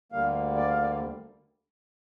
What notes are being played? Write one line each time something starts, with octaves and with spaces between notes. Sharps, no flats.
D2 D3 G3 A#3 F5
D5
F5
D5